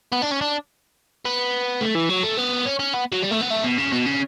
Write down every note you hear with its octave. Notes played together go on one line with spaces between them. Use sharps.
B3
D4
C#4
D4
B3
A3
E3
F#3
A3
B3
C#4
C#4
B3
F#3
G3
A3
B3
A3
B2
C#3
B2
C#3